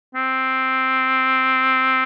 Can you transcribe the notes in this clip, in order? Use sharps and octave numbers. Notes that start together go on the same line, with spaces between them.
C4